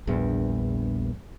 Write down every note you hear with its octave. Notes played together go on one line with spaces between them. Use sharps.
A#1 E2 G2